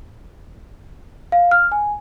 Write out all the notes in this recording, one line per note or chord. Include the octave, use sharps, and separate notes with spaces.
F5
F6
G#5